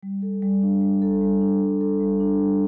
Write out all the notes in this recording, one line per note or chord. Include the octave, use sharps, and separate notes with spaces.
G3
A4
G3
D4
G3
A4
G3
D4
G3
A4
G3
D4
G3